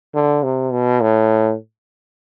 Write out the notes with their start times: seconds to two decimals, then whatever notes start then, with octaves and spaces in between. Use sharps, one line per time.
0.14 D3
0.44 C3
0.72 B2
1.02 A2